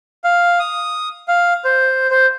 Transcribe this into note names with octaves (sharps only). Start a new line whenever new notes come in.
F5
D#6
F5
C5
C5